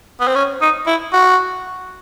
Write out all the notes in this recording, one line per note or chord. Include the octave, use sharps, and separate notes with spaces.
B3
C4
C#4
D#4
E4
F#4